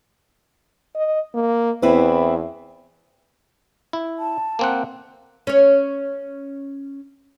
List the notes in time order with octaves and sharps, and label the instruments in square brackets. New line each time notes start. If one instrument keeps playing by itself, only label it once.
[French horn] D#5
A#3
[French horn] E2 [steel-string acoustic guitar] C4 E4 B4
[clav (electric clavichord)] E4
[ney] A5
[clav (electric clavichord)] A#3 C4 F#5
[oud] C#4 C#5